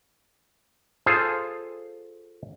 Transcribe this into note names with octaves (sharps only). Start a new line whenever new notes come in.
F4 G#4 A4 C5